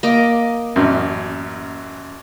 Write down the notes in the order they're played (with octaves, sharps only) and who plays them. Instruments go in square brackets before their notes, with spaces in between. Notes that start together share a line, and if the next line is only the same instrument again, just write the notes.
[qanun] A#3 D#5 D6
[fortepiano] A1 F#2